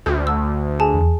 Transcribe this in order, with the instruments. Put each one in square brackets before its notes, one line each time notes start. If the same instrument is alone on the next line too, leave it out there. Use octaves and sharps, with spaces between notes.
[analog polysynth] D2 [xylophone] G6
[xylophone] A5 E6
G#4 G#5 A5
[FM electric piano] E2